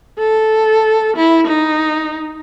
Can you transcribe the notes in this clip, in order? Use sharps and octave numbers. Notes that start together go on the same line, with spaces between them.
A4
E4
D#4